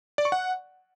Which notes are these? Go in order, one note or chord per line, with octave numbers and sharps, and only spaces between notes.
D5
C#6
F#5